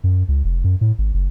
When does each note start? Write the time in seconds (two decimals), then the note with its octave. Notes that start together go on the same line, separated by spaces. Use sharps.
0.04 F#2
0.28 C#2
0.45 F1
0.64 F#2
0.81 A2
0.98 G#1
1.14 F#1